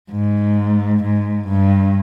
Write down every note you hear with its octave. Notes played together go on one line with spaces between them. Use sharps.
G#2
G#2
G2